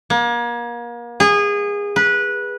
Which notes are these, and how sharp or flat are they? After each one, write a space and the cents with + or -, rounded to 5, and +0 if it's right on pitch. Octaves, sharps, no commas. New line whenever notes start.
A#3 +35
G#4 -25
B4 -15